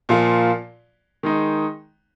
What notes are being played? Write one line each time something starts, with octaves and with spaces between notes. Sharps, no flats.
A#2 F3 A#3 F4
D#3 G#3 D#4